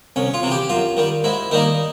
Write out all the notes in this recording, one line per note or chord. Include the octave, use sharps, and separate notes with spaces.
C2 C#4
F4
C3 E3
G4
F#2 F4
D#3 G3
G#2 E4
D#3 G3 A#3 D#4